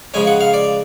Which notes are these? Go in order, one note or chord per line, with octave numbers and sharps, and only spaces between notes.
C#3 F3 G#3 C#4 G#5
F#5
F5
D5